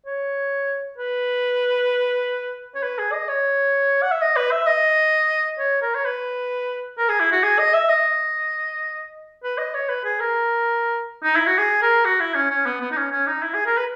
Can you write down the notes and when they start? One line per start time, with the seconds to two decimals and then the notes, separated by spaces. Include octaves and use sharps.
0.06 C#5
0.98 B4
2.75 C#5
2.83 B4
2.98 G#4
3.13 D#5
3.28 C#5
4.02 F#5
4.12 E5
4.21 D#5
4.36 B4
4.51 E5
4.66 D#5
5.58 C#5
5.82 A#4
5.95 C#5
6.05 B4
6.98 A#4
7.09 G#4
7.20 E4
7.32 F#4
7.43 G#4
7.59 D#5
7.74 E5
7.89 D#5
9.43 B4
9.58 D#5
9.74 C#5
9.89 B4
10.04 G#4
10.20 A#4
11.24 D#4
11.36 E4
11.47 F#4
11.58 G#4
11.82 A#4
12.05 F#4
12.20 E4
12.35 C#4
12.50 C#4
12.66 B3
12.81 B3
12.91 D#4
12.96 C#4
13.11 C#4
13.27 D#4
13.42 E4
13.54 G#4
13.66 A#4
13.77 B4